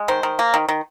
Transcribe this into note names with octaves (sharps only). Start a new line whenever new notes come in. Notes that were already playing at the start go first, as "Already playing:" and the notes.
Already playing: G#3
D#3 C5
D#3
A#3
D#3
D#3